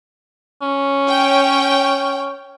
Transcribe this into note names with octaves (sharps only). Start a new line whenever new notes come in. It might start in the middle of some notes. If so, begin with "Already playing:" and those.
C#4
C#5 G5